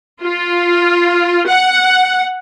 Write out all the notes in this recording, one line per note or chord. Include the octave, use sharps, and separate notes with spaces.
F4
F#5